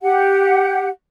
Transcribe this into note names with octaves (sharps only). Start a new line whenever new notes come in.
G4 F#5